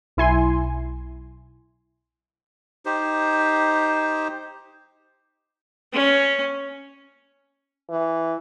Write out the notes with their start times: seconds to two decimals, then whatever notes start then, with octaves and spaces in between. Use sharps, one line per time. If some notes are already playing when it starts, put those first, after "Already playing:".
0.17 B1 E4 G#5 C6
2.85 D#4 G4 C5
5.93 C#4
7.90 E3